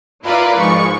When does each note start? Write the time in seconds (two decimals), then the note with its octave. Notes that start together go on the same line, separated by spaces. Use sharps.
0.25 E4 F4 A#4 B4 D5
0.59 G#2 F3 C#6